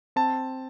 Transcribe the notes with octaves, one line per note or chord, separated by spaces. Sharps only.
C4 A5